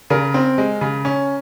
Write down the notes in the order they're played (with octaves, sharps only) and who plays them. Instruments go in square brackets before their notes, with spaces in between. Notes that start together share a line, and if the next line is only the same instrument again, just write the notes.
[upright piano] C#3 A#4
C4
G#3
C#3
C#4